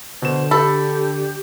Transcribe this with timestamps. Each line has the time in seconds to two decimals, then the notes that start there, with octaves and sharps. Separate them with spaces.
0.22 B2 D3 C5 E7
0.51 G4 A4 B5